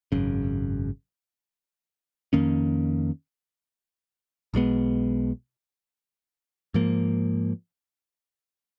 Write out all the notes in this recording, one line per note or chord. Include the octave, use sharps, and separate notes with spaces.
G#1 F#2 C#3
F2 D#3 A#3 C#4
B1 B2 G#3 B3
G#2 F3 A#3